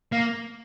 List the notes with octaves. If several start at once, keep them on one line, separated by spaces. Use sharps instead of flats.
A#3